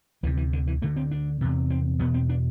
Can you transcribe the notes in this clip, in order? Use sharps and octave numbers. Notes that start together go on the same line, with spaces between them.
D2 C3 E3
E3
D3
E3
D2 D3 A3
C4
D4
E2 C3
C4
E2 B2 B3
C4
D4